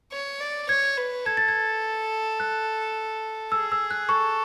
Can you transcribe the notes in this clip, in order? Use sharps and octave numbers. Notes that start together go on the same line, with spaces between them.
C#5
D5
C#5 G#6
B4
A4 G#6
A6
G#6
F#6
G#4 E6
E6
F#6
A4 C#6